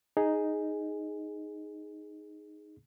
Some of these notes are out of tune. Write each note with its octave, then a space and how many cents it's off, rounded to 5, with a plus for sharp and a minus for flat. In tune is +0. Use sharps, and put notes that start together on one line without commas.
D#4 +0 G#4 +0